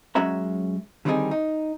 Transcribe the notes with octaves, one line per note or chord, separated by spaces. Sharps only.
F#2 G#3 C#4 F#4 E5 A#5
D3 D#3 G3 C4 D#4 G#4
D#4